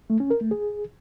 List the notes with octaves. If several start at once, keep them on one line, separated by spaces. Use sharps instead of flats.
A3
C#4
A#4
A3
G#4